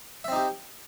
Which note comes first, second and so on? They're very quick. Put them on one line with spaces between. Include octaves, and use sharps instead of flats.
E5 C4 D#4 G4